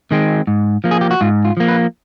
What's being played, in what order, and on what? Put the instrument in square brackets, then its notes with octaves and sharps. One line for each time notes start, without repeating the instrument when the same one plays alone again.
[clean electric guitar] D#3 G#3 C4
G#2
F3 A#3
G#4
G4
F#4
G#2 F4
F4
F3 A#3
B4